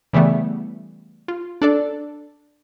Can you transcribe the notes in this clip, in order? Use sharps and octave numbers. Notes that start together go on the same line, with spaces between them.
C#3 E3 G3 A3 B3
F4
D4 A4 D5